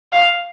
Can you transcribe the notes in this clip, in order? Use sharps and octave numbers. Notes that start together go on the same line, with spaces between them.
F5